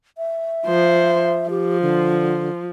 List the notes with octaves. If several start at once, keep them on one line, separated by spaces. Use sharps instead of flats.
E5
F3 C5
F3 G4
D3